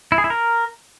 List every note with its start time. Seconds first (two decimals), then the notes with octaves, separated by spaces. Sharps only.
0.12 E4
0.18 G#4
0.24 E4
0.30 A#4